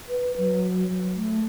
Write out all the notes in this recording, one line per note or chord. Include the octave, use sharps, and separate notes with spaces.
B4
F#3
A3